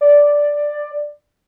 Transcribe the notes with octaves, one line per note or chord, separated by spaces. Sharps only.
D5